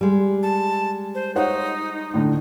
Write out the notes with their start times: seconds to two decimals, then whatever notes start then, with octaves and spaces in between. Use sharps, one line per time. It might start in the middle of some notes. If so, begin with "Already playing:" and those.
0.01 G3 G#3
0.43 A5
1.15 C5
1.36 D#4 C5 C#5 F#5
2.14 A2 D3